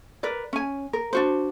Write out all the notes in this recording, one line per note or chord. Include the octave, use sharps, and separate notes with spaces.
A#4 B4 D5
C#4 G#5
A#4
D4 F#4 C5